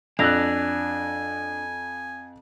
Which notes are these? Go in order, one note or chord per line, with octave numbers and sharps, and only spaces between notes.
F2 D4 G#5 E6 F#6 A#6 F7